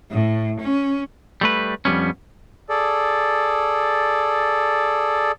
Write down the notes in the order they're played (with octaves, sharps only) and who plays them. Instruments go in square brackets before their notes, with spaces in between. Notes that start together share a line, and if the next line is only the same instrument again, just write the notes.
[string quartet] A2
C#4
[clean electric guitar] G3 A3 B4
F2 G#2 G3 B3 C#4
[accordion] G#4 A4 D5